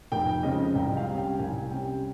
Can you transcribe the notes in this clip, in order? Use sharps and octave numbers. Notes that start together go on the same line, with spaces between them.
F1 G5
F2 C#3 G#3 C4 D#5
C2 G5
F5
C3 G3 C#4
G5
C2 G#5
C3 G3 C#4 G5